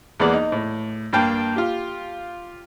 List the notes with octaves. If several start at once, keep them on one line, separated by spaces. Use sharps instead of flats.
E2 G#3 A#3 B3 D5
D#4
A2
G2 A#3 G5 A5
F4 G4